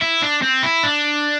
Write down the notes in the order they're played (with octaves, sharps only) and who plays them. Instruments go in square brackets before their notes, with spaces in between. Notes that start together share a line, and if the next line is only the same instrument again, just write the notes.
[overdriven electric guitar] E4
D4
C4
E4
D4